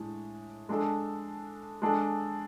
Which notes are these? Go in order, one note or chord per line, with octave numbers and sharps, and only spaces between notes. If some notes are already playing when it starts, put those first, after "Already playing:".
Already playing: A2 G#3 D4
G#3 D4 A4
G#3 D4 A4